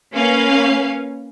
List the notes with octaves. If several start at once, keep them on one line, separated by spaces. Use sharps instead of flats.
A#3 C#4 B4 F5